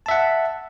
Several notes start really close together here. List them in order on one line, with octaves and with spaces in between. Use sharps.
A5 E5 F#5